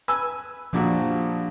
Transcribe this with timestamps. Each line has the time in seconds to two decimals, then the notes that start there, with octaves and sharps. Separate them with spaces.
0.08 B4 G#5 E6
0.73 A#1 A#2 F3 D4 F#4 G4